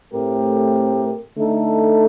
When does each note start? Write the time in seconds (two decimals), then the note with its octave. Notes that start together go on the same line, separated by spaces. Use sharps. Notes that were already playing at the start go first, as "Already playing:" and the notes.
0.13 A2 A3 C4 G4 A#4
1.37 D3 A3 D#4 A4